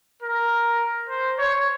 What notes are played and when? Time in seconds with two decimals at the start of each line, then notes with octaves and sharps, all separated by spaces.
0.23 A#4
1.09 C5
1.39 C#5